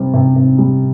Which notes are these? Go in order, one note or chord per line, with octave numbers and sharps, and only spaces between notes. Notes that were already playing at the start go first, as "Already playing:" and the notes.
Already playing: C3 G3 C4
C3
C3
G3